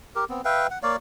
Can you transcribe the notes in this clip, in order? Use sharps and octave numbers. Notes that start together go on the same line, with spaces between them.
G4 A#4
B3 C4
B4 E5 F5 G5
F#5
A#3 C#5 D5 F5